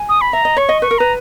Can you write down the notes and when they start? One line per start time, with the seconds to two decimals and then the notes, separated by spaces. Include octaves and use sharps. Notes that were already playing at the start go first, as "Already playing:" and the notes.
Already playing: G#5
0.09 D#6
0.21 B5
0.33 E5 A#5
0.45 D#5
0.57 C#5 C#6
0.69 D#5
0.82 B4 C#6
0.91 A#4
0.98 B4 A#5